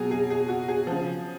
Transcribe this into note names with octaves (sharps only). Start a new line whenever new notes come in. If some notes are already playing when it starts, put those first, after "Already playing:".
Already playing: B2 F#3 G#4
G#4
G#4
F#4
G#4
C#3 F3